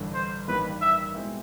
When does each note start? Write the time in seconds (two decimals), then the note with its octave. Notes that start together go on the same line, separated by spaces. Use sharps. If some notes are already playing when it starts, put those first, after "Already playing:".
Already playing: A1 G2 D3
0.14 C5
0.48 A1 G2 D#3 G3 A#3 B4
0.81 E5
1.15 B2 G#3 C4 E4